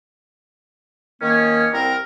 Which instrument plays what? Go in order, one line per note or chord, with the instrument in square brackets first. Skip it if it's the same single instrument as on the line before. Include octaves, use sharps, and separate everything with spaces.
[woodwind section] D#3 A#3 C#4
C2 C4 A#4